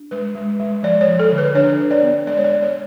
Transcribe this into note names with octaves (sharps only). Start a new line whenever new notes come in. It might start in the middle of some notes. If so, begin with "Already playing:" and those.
Already playing: D4
G#3 B4
G#3
G#3
F3 D5
C#5
F3
A4
D3
B4
D4 C#5
D4
D5
B3
G#3 D5
C#5
D5
G#3
C#5